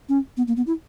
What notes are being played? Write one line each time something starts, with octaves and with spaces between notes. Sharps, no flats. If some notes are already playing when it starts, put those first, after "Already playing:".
C#4
B3
A#3
B3
E4